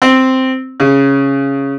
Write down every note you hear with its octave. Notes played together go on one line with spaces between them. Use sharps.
C4
C#3